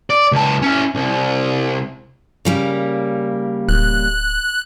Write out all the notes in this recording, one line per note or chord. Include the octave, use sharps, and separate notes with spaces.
D5
C#2 A5
C#4 E4
C2
C#3 G3 A#3
D1 F#6